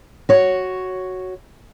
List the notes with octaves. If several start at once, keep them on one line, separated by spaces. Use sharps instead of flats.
F#4 C#5